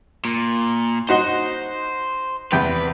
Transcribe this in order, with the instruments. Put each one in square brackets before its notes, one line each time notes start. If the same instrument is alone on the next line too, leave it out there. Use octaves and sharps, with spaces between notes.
[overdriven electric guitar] A#2
[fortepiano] D#4 F#4 C6 [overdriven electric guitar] C5
[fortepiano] E2 C3 G5 [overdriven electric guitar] B4